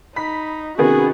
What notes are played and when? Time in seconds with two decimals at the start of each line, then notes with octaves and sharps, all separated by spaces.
0.16 D#4 B5 B6
0.78 C3 D#3 B3 C#4 F#4 G#4